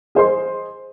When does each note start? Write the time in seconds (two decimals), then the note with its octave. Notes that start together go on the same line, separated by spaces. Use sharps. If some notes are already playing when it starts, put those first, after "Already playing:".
0.15 G#4 C5 D#5 C6